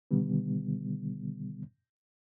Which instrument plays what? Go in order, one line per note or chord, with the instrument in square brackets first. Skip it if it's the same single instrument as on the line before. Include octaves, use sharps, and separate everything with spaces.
[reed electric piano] B2 D3 D#3 G3 B3